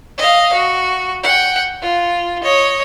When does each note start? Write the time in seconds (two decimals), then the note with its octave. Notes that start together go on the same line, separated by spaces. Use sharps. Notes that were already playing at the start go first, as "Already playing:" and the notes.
0.18 D#5 F5
0.53 F#4
1.23 F#5 G5
1.82 F4
2.43 C#5 D#5